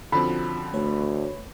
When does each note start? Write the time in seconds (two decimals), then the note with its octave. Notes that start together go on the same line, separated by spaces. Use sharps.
0.12 D3 F3 C4 C#4 F4 F#4 B5
0.73 D2 A3 B4 C#5